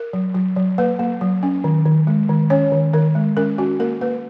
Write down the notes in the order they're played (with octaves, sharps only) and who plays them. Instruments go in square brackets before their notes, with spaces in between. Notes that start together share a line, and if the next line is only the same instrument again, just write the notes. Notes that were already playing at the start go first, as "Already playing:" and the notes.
Already playing: [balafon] A#4
F#3
F#3
F#3
A#3 B4
A#3
F#3
C#4
D#3
D#3
G#3
D#3
C#4 C#5
D#3
D#3 A#4
G#3
C#4 A#4
C#4 F#4
A#3 A#4
A#3 B4